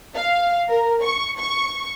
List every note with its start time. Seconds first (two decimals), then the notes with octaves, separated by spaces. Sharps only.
0.15 F5
0.68 A#4
1.02 C#6
1.38 C#6